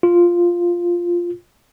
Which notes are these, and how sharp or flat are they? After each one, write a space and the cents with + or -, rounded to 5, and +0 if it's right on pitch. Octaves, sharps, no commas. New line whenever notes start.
F4 -5